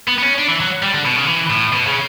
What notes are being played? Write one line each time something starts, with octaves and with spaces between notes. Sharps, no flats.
B3
B3
C#4
D4
E3
F#3
G3
D3
B2
C#3
E3
A2
B2
C#3